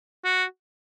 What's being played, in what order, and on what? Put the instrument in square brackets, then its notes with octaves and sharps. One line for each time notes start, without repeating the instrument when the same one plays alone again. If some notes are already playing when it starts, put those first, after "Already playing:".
[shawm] F#4